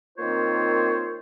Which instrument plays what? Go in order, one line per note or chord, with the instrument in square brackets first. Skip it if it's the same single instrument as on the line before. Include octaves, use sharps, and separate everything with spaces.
[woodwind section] D#3 A#3 C4 F4 C5 C#5